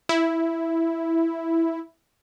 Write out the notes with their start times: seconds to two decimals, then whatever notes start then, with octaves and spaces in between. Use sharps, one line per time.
0.09 E4